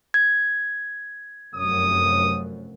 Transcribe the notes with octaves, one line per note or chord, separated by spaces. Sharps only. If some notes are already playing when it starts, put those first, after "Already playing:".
G#6
F1 F#2 D#6